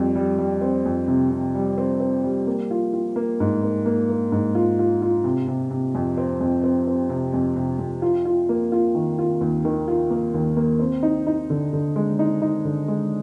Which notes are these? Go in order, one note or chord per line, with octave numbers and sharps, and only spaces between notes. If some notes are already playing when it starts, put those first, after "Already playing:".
Already playing: F2 G3
G3
G3
C4
F2
C3
C3
G3
C4
C4
G3
A#3
F4
F4
A#3
G#2
A#3
A#3
A#3
G#2
F4
F4
F4
C3
C3
C3
F2
C4
F2
C4
C4
C3
F2
C3
F2
F4
F4
A#3
F4
D#3
F4
D#2
D#3
F4
A#3
D#2
A#3
C4
D#4
D#4
D3
D3
G#3
D#4
D#4
D3
G#3